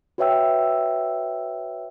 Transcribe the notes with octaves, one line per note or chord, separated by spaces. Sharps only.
F#4 B4 C#5 E5 G5 E6